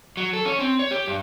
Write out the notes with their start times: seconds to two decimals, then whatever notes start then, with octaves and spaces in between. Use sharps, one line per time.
0.17 F#3
0.33 A4
0.45 C#4
0.59 C4
0.79 C#5
0.91 G4
1.08 G2